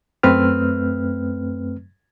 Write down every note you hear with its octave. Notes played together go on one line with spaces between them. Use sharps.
F#2 A3 C4 B4 F6